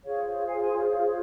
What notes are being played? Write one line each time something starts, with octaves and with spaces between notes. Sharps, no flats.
F4 G#4 C5 C#5 F5
C#5 F5
F5 G#5
G#5 C6
C#5 F5
C#5 F5
C#5